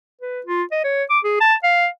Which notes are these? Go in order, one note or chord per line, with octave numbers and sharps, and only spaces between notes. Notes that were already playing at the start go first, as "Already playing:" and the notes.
B4
F4
D#5
C#5
D6
G#4
A5
F5